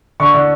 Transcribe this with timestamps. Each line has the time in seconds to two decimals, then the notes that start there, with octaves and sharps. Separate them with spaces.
0.20 D3 C#6
0.34 D3